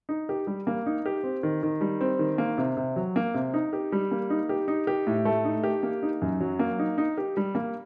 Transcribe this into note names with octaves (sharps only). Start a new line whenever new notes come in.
D#4
G4
G3
A#3
D#4
G4
C4
D#3
D#3
G3
C4
D#3
A#3
C3
C3
F#3
A#3
C3
D#4
G4
G3
A#3
D#4
G4
D#4
G4
A2
A3
D#4
G4
A#3
D#4
F#2
F#3
A#3
D#4
D#4
G4
G3
A#3